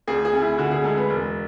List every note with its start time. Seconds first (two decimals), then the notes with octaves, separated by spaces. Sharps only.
0.07 D2 G#4
0.25 G#4
0.33 D2
0.41 E4
0.58 D3 F#4
0.71 G#4
0.84 G#3 A4
0.97 B4
1.10 E1